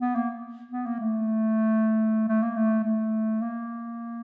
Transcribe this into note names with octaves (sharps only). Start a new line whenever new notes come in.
B3
A#3
B3
A#3
A3
A3
A#3
A3
A3
A#3